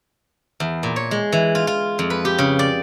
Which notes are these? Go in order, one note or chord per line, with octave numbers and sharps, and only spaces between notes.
E2
A#2
C#5
G#3
E3
F4
F4
F2
B4
G4
C#3
D5